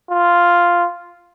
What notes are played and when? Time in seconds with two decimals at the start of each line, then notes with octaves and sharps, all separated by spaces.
0.11 F4